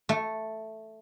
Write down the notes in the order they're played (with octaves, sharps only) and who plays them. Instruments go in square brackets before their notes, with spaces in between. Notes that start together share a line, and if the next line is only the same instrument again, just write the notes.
[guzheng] A3